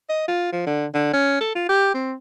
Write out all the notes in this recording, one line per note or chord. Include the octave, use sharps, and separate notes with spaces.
D#5
F4
F3
D3
D3
C#4
A4
F4
G4
C4